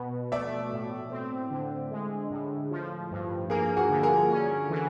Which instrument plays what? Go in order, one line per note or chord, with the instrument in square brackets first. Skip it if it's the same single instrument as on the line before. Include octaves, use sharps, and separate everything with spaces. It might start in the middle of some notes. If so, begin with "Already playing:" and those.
Already playing: [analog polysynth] B2 B3
[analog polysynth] A3 [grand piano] D5 E5
[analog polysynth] A2
C4
D3
G#3
A2
F3
G2
[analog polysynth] A#3 [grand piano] G#4 A#4
[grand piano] F#4 G#4
[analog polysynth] D3
[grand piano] G#4 A#4
[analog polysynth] C#4
E3